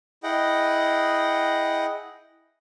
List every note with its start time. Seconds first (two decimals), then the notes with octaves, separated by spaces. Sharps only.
0.23 E4 G#4 D#5 F#5 G5